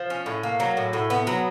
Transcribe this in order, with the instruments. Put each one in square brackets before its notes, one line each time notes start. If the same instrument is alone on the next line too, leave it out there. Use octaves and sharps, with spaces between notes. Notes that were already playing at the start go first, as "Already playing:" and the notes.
Already playing: [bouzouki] F3
C#4
A2
A#3
F#3
A2
A2
B3
F#3